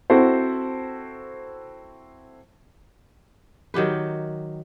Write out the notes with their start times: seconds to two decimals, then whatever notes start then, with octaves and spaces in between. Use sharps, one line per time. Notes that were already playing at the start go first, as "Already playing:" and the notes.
0.10 C4 E4 F#4 A4 C5
3.74 D#3 F#3 G4 B4